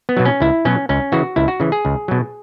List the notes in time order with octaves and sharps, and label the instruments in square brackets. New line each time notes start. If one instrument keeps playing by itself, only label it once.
[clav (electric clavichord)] B3
B2 F#3
C#4
C#2 E4
B2 F#3 C#4
C#2 C#4
C#3 E3 F#4
C#2 E4
F#4
C#3 E3
G#4
C#2
B2 F#3